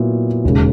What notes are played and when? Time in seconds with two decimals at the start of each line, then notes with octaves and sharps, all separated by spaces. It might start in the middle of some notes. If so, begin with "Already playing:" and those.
Already playing: A#2 F#3 B3 E4
0.44 E1 D#2 C#3